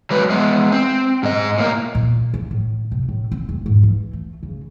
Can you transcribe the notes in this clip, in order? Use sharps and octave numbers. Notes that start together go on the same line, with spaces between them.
F#3 G#3 B4
G#3 B3
C4
G#2 D#5
A2 A#3
A#2
A#3
A2
C3
A2
C4
E1
G#2
E3
A3
C#3